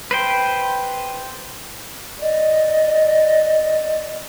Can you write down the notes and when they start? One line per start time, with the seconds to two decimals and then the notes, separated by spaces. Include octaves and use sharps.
0.11 B4 C5 G5
2.21 D5 D#5